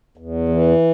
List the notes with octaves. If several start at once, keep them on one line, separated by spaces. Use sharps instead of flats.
E2
E3